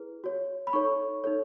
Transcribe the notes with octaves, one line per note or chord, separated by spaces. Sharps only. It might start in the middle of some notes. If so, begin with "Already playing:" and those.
Already playing: E4 G#4 B4
F#4 C#5
B5
D#4 A4 C#5 C#6
D#4 A4 C#5